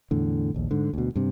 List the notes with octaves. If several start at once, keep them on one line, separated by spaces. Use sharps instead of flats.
E2 A2 D3
A#1 D#2
G#2 D3
D2 B2
G2 C3